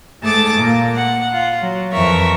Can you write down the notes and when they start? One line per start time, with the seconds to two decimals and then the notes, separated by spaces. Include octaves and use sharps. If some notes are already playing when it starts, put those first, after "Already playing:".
0.23 G#2 A3 G#4 A5 D6 A6
0.56 A#2 A#3
0.95 F#5
1.32 F4
1.61 F#3
1.92 F2 E3 A#4 E5 C#6